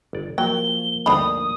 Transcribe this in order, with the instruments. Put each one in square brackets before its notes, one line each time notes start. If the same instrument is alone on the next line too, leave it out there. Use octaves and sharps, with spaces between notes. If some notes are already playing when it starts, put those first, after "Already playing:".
[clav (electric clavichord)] G1 D5
[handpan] F3 A#3 [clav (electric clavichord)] F#3 [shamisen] G5 [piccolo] G7
[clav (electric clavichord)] D2 G2 [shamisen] D4 D#4 B5 [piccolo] D#6